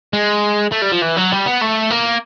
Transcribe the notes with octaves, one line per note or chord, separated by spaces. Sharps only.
G#3
A3
G3
F3
E3
F#3
G3
B3
A3
A#3